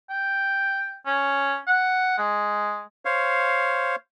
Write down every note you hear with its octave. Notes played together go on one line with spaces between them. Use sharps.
G5
C#4
F#5
G#3
C5 C#5 F5